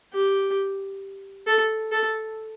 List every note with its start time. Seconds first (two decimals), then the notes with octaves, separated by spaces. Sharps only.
0.13 G4
1.47 A4
1.92 A4